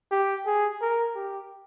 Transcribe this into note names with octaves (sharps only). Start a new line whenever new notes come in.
G4
G#4
A#4
G4